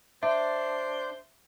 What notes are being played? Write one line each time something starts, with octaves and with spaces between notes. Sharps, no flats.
D4 C5 E5